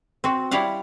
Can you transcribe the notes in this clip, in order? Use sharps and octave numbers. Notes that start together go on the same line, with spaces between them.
C4 F#4
G3 E4 G4 C#5 F5 F#5